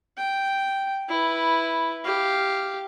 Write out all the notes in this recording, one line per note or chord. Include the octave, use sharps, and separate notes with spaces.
G5
E4 B4
G4 F5